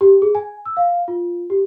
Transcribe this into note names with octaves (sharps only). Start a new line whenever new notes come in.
G4
G#4
G#5
E6
F5
F4
G4